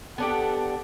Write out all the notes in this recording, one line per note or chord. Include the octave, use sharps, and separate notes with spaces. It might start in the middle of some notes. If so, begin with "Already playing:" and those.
B3 D4 G4 A4 F#5